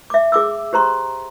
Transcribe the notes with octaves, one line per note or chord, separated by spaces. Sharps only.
E5 D6
G#4 D6 E6
G4 C5 A#5 C6